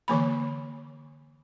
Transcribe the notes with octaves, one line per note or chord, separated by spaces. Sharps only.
D3 E3 A#3 B5